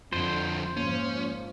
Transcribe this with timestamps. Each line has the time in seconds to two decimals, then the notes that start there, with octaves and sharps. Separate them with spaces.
0.13 F2 D3 F3 C5
0.77 G#2 F3 A#3 C#4